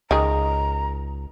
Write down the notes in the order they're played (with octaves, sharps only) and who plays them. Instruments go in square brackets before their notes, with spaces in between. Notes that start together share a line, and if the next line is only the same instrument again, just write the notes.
[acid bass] C#2 [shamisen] D#3 G#4 [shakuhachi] A#5